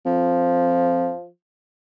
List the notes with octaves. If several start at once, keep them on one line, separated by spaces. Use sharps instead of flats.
F2 F3